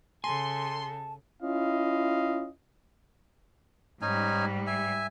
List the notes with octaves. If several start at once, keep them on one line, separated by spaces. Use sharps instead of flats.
C#3 A4 G#5 A5 C6
C#4 E4 F4 D#5 F5
G#2 G3 C#4 D#4 G#5
E5 G#5